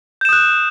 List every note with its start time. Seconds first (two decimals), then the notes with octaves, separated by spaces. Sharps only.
0.21 G6
0.25 E7
0.29 D#6
0.33 F#6